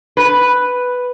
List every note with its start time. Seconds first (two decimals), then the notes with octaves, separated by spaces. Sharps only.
0.17 B4